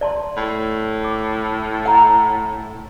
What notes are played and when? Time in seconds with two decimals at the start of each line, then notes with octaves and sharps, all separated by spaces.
0.01 D5 A5 C6
0.37 A2
1.04 D6
1.86 F#5 A#5